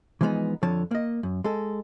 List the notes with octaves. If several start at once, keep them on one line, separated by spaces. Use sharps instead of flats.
E3 F3 G#3 A#3 B3 D#4
F2 D3 F3 C#5 A5
A#3 D#5
F#2
G#3 A4